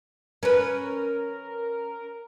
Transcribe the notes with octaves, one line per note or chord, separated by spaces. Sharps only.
C#4 A#4 B4